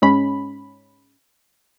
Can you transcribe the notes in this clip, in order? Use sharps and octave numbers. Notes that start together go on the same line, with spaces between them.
G#2 G#3 C#4 B5